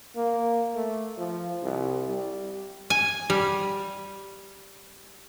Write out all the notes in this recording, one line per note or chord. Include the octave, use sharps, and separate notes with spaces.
A#3
A3
F3
C2
G3
G#5
G3